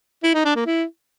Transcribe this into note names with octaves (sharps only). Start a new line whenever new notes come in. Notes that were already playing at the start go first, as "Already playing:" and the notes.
E4
D#4
D4
A#3
E4